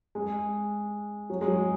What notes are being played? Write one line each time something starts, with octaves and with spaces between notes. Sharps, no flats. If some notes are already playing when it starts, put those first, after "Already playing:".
G#3
F#3
G#3
F#3